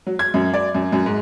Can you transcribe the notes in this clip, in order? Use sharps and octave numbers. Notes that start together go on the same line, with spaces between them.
F#3
G#6
F#2
D5
F#2
F#2
G#2